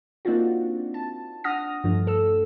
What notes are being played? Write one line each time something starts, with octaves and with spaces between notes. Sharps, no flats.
A#3 C4 D4 D#4 F4 F#4
A5
D4 F#5 D#6 F6 A#6
G2 F3 A3 D4
A4 E6